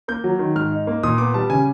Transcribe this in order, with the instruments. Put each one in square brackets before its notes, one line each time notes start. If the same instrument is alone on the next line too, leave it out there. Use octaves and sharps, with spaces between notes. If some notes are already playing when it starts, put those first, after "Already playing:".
[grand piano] A#3 G6
F#3
D#3
G#2 F6
D#4
A#3
A#2 D#6
B3 D6
G3 A5
C#3 G#5